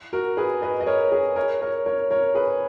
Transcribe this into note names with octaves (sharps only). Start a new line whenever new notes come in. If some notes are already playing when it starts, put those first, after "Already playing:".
F#4 A#4
G#4 B4
B4 D#5
D#5
A#4 C#5
G#4 B4
A#4 C#5
A#4 C#5
A#4 C#5
A#4 C#5
G#4 B4